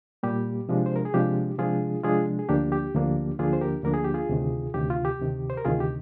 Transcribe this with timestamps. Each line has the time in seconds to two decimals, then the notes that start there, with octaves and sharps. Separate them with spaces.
0.23 A#2 G3 A#3 G4
0.69 C3 F3 G#3 D4
0.86 C5
0.96 A#4
1.05 G#4
1.14 C3 F3 G#3 D4 G4
1.58 C3 F3 G#3 D4 F4 G#4
2.03 C3 F3 G#3 D4 F4 G#4
2.39 G#4
2.49 D2 D3 F3 A#3 D4 G4
2.72 G4
2.94 D2 D3 F3 A#3 D4
3.39 D2 D3 F3 A#3 D4 F4 G#4
3.53 C5
3.61 G4 A#4
3.84 D2 D3 F3 A#3 D4 A#4
3.94 G#4
4.04 G4
4.14 F4 G#4
4.29 D2 C3 D#3
4.74 D2 C3 D#3 G4
4.90 F4
5.05 G4
5.20 D2 C3 D#3
5.50 C5
5.58 A#4
5.65 D2 C3 D#3 F4 G#4
5.80 G4